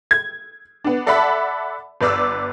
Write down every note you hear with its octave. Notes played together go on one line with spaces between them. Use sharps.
G#6
B3 D4
A4 D5 E5 F#5 A5 B5
G1 B4 D5 D6 E6